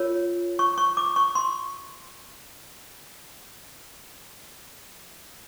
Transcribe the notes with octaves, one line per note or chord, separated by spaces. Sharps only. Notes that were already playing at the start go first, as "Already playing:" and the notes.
Already playing: F4 A#4 C#5
C#6
C#6
D6
C#6
C6